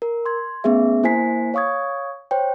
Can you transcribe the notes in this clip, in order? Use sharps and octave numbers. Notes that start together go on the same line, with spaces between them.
A#4
C6 G#6
A3 B3 C#4 G#4 E5
A#3 E4 C5 G#5 B6 C7
C#5 F5 C#6 D#6 G#6
C5 C#5 G5